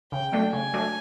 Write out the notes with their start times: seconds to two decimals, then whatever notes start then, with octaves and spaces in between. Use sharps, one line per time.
0.12 C#3 G5
0.32 F#3 A3 D4
0.53 C#3 G#5
0.73 F#3 A3 D4